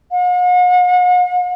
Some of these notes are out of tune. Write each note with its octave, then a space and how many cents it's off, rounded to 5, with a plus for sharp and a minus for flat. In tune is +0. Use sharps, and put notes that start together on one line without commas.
F#5 -45